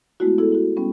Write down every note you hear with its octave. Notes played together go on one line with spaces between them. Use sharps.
G#3 A3 B3 E4 F#4
B3 E4 G#4 A4
E4 F#4
G3 B3 C#4